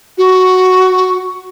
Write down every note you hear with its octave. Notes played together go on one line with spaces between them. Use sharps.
F#4